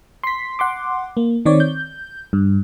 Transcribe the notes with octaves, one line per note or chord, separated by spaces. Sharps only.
C6 B6
F#5 C6 D6
A#3
D#3 C4 C#5 D5
G6
G2